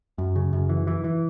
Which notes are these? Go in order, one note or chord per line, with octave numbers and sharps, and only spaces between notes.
F#2
C#3
F#2
E3
E3
E3